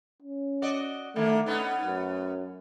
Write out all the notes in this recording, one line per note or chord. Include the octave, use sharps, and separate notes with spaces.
C#4
F#4 D5 D#5
D3 D#3 A3 A#3
A3 B3 C#4 D#4
F#2